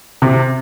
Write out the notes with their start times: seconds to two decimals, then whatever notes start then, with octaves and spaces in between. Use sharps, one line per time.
0.22 C3